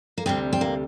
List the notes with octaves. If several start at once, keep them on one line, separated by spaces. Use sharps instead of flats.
A#3
D2 C3 G3 C4
C4
A#3